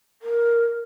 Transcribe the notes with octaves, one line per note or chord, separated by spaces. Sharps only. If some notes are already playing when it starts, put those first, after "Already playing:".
A#4